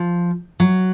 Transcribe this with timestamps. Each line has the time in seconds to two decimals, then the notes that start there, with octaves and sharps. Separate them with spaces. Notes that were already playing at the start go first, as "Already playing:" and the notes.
Already playing: F3
0.60 F#3